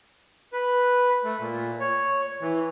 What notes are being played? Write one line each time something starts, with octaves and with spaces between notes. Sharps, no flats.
B4
A3
A#2
C#5
E3